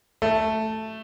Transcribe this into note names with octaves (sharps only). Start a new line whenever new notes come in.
A3